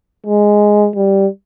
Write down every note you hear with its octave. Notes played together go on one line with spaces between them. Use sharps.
G#3
G3